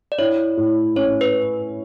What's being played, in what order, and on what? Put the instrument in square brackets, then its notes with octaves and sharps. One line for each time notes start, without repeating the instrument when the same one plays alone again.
[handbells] D5
[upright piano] E4 [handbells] C#5
[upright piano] A2
[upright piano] C#4 [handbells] C#5
[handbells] B4